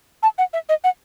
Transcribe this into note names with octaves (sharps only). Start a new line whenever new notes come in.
A5
F#5
E5
D#5
F#5